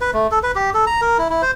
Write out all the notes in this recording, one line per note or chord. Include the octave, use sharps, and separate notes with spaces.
B4
A3
A4
B4
G4
A4
A#5
A#4
E4
E4
C5